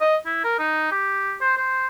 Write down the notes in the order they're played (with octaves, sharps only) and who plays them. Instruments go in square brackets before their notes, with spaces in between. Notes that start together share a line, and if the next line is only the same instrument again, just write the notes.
[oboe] D#5
E4
A#4
D#4
G4
C5
C5